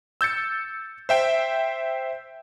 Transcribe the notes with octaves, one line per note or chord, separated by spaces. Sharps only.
E6 G6 A6 C#7
C5 E5 G5